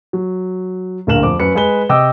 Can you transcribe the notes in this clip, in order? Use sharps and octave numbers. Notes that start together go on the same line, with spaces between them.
F#3
D1 A#1 A#4 F5 E7 F#7
F2 D6
F#2 B4 C#7
G#3 G#4 B4 G7
C3 D#5 G5 D6 E6